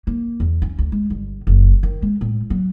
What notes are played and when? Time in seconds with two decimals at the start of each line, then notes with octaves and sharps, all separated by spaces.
0.07 A#3
0.40 E2
0.62 C#4
0.79 D2
0.92 G#3
1.10 G1
1.47 F#1
1.83 D#3
2.02 G#3
2.21 A2
2.50 F#3